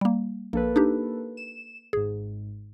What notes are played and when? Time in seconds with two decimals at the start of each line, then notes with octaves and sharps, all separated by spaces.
0.01 G3 A#3
0.53 A#1 A#3 A4 B4
0.76 D4 D#4 G4
1.37 E7
1.93 G#1 G#2 G#4